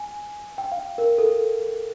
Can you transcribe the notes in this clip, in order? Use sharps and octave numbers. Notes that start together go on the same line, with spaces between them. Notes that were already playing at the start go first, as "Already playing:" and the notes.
Already playing: G#5
G5
F5
A#4
A4